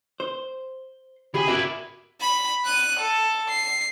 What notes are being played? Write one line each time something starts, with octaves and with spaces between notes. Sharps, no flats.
C5
C#3 G4 G#4 B5
E4 F#4 A#4 D5 E5
B5
F#6 D#7
A4
C7